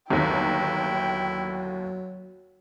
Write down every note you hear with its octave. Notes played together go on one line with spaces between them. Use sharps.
G1 D#2 F#3 E4 G5